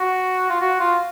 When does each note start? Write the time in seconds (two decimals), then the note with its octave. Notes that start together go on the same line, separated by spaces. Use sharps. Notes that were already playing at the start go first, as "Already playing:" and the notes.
Already playing: F#4
0.50 F4
0.61 F#4
0.80 F4